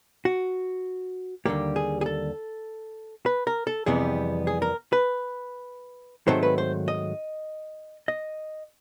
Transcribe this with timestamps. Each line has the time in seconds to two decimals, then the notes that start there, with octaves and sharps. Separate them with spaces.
0.25 F#4
1.45 D#2 D3 G3 A#3 G4
1.76 G#4
2.01 G#4
2.06 A4
3.26 B4
3.47 A#4
3.67 A4
3.86 F2 C3 E3 G3 B3 G#4
4.47 G#4
4.62 A#4
4.93 B4
6.27 G#2 D#3 F#3 A3 C4 C5
6.43 B4
6.58 C5
6.88 D#5
8.08 D#5